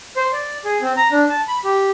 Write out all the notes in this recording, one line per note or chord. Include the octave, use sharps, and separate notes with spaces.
C5
D5
G#4
C4
A#5
D4
A5
B5
G4